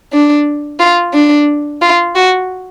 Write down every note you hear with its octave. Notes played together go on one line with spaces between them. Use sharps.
D4
F4
D4
F4
F#4